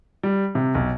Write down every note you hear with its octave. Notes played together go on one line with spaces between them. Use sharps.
G3
C3
B1